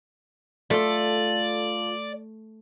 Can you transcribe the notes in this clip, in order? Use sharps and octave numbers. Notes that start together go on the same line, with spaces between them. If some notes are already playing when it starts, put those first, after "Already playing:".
A3 F4 A4 D5